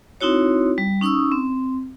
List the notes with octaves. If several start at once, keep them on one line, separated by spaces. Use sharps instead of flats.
C4 D#4 E4 F#4 C#5
G3
C#4 D#4 C#6 D#6 E6
C4